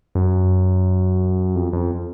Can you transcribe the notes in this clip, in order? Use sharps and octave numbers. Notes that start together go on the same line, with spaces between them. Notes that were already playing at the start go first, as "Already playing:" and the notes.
F#2
F2
F2